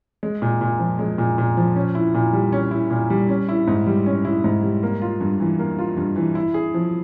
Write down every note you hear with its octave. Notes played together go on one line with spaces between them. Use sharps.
G#3
A#2
A#2
F3
G#3
A#2
A#2
F3
C#4
E4
A#2
G3
C#4
E4
A#2
G3
C#4
E4
G#2
G3
C#4
E4
G#2
G3
A#3
F4
G2
E3
A#3
F4
G2
E3
E4
G#4
F3